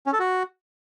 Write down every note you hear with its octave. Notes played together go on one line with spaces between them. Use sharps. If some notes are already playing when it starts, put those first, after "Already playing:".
C#4
A4
F#4